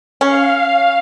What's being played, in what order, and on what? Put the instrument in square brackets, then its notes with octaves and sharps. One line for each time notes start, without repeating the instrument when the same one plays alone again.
[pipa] C#4 [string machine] F5